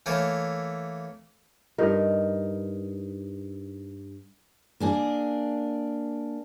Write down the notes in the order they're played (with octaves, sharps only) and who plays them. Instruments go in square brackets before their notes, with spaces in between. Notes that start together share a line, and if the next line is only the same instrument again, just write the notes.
[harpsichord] E3 A3 A#3 C#5
[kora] G2 D#4 A#4
[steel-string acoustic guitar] A#3 D4 G#4